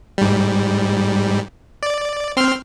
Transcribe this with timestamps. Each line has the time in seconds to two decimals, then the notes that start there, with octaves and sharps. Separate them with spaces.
0.18 G#2 G3
1.83 D5
2.37 C4 C6 F6